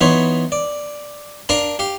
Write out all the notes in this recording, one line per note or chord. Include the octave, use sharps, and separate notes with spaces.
E3 B3 D#4 C5 C#5
D5
D4 A#4 F5 A5 A#5
G4 F5